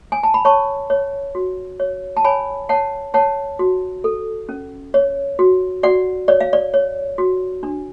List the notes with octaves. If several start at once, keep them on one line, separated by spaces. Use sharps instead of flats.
G#5
A5
B5
C#5 A5 C#6
C#5
F#4
C#5
A5
C#5 G#5 B5
C#5 F#5 A5
C#5 F#5 A5
F#4
A4
C#4
C#5
F#4
F#4 D5 F#5
C#5 D5
F5
D5
C#5
F#4
D4